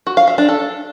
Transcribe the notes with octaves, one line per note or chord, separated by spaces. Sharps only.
F#4
F5
E5
D4
A4